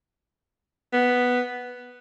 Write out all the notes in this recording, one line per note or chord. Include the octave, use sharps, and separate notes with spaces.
B3